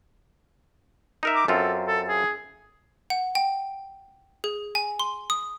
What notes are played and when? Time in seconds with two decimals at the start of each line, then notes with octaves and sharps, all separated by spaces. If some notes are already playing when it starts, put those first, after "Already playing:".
1.23 D#4 A#4 E5
1.35 D6
1.48 F#2 C4 F4 A4
1.88 A4
2.09 G#4
3.10 F#5
3.35 G5
4.44 G#4
4.75 G#5
4.99 C6
5.30 D#6